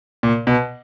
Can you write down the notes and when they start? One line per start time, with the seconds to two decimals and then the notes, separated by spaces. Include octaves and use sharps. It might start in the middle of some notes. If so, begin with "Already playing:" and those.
0.23 A#2
0.47 B2